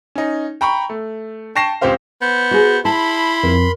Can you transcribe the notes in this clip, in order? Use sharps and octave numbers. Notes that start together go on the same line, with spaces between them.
C#4 D#4
G5 A#5 B5 C#6
A3
G5 A5 C#6 A#6 C7 E7
C#2 C4 G4 C5 F5
B3 C5
F#4 G#4
E4 A5 B5 C6
F2 A#4